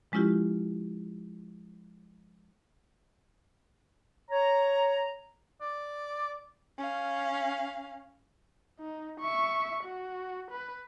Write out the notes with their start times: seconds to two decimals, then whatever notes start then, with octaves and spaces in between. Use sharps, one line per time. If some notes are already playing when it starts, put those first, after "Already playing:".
0.12 F3 G#3 C#4 E4 F4 G4
4.30 C#5 A#5
5.61 D5
6.78 C#4 F5
8.80 D#4
9.20 E5 C#6
9.84 F#4
10.51 B4